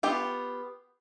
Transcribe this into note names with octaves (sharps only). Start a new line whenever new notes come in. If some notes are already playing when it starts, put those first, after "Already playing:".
B3 F4 G4